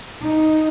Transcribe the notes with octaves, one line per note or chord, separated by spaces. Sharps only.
D#4